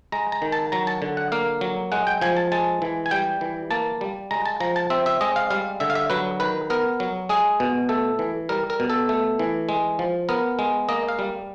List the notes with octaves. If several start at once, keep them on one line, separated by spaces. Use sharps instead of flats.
G#3 A#5
A#5
D#3
A5
F#3 A#5
A5
D3
F#5
A#3 F5
F#3
G#3 F#5
G5
F3 G#5
A5
G#3 A5
E3
G#5
G3 G5
E3
A#3 A5
G3
G#3 A#5
A5
F3 A#5
A5
C4 E5
E5
G#3 D#5
F5
G3 F5
D3 E5
F5
E5
F#3 B4
D#3 B4
B3 A#4
F#3
G#3 G#4
B2
A3 A4
E3
G3 A#4
A#4
B2
A4
A3
E3
G#3
F3
B3 A#4
G#3
A#3 D#5
F5
G3